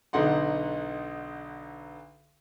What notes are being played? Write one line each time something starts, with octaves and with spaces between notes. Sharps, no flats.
B1 D3 D#4 F#5 C6